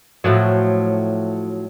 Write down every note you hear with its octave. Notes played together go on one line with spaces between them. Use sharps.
A2 F3 F#3